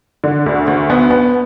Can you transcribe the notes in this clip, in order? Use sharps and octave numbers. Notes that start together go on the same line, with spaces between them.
D3
D2
D2
B3
B3